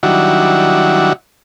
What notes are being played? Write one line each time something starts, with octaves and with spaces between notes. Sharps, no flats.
D#3 F#3 G3 D4 E4 F#4